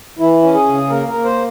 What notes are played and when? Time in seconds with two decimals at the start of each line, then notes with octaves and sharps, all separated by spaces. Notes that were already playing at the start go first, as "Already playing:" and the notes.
0.19 E3 E4
0.42 C#4
0.54 G#4
0.67 C#3
0.89 A#3 A#4
1.08 A#4
1.14 A#3
1.25 C5